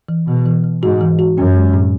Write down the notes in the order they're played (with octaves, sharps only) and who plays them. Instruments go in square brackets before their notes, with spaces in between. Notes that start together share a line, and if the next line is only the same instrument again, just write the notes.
[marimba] E3
[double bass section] B2 [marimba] E3
[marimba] E3
E3
[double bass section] G#2 [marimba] F#4
[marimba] E3
F#4
[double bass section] F#2 [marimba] C#4
[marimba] G#3
A2